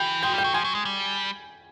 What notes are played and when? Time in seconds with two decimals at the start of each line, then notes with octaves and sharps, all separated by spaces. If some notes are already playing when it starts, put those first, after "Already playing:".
Already playing: E3 G5 G6
0.23 G#3 G5 G6
0.34 G3 G5 G6
0.44 F#3
0.54 F3 G#5 G#6
0.64 F#3
0.75 G#3
0.85 G3